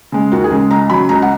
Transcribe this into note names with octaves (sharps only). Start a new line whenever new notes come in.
C#3 G#3
D#2 F#4
G#4
C#3 G#3
C#2 A#5
C#3 F#3 B5
C#2 A#5
F#5